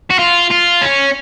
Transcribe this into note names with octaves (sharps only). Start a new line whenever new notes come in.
F#4
F4
F4
C#4